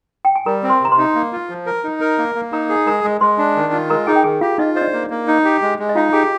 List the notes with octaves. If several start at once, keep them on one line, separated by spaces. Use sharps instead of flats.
G5
G#5
G3 A#4 A#5
C4
C5 C6
C3 A#5
C5 C6
D#4
A#3
F4
F3
A#4
D#4
A#4
A#3
A#3
D#4 A#4 A#5
G#4
G#3 A#4 A#5
G#3
G#3 C5 C6
D4
D#3
F4
G#3 A#4 A#5
D#4 G#4 G#5
G5
D#3 G#4 G#5
F4 G4 F5
D#4 F4 D#5
C5 D#5
D4 D5
A#3
A#3
D#4
G4
G#3
G#3
D#5
D#4 F4 F5
G4 G#4 G#5